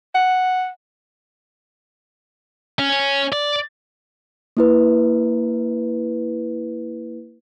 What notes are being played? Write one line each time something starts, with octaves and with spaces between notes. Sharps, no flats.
F#5
C#4
D5
A#3 E4 B4